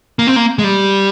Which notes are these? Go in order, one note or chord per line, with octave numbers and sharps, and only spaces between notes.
A#3
C4
A#3
G#3
G3